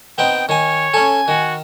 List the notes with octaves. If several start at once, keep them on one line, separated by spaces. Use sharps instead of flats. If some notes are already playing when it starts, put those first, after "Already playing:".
B3 C4 D#4 G5
D#3 C#5 G#5
C#4 A4 G#5
D#3 F#4